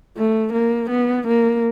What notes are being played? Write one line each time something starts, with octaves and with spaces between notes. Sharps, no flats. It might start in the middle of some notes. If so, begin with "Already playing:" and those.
A3
A#3
B3
A#3